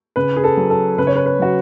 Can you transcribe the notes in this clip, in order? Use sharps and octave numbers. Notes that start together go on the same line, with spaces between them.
C#3 B4
G#4
A4
F#3
A4
C#3 B4
C#5
B4
B4
F#3 F#4